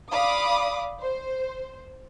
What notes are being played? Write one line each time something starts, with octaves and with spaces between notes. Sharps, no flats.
D5 F5 B5 D6 D#6
C5